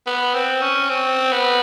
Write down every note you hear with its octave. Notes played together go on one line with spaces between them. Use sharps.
B3
C4
C#4
C4
B3